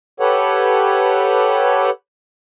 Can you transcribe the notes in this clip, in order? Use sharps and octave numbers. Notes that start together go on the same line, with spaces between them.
G4 A4 B4 C#5 F#5